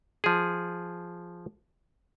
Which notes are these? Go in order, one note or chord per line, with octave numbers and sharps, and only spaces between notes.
F3 G#4